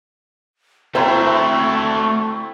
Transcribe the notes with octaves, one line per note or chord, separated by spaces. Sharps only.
A3 C4 E4 F#4 C5 A#5 C#6